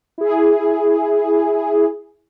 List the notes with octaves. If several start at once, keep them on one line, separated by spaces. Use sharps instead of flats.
E4 G#4